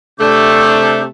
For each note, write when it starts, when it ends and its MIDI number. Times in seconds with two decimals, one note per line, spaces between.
0.20 1.05 48
0.20 1.05 57
0.20 1.02 62
0.20 1.02 86
0.20 1.02 91